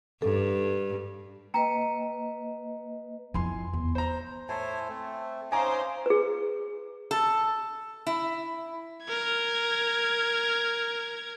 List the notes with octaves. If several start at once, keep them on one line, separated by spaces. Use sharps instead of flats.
G2 A4
A#3 B4 D#5 G5 A#5
F2 E4 G#5 C6
E2
C5 A#5
A2 E4 C5 C#5 G#5 A5
A3 C4
C#4 D#4 C5 F5 G#5 A#5 D6 D#6
G#4 B4
A4
E4
A#4 G#6